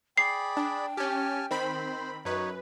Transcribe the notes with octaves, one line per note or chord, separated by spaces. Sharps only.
G#4 D5 G5 B5 C7
D4
C#4 G4 G#5 A5 F6
D#3 C4 C5 B5
F#2 D#4 F#4 B4 C#5